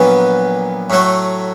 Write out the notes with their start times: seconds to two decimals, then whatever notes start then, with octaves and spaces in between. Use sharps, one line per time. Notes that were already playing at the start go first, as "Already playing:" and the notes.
Already playing: A#1 A#2 F#3 B3
0.90 A2 F#3 A3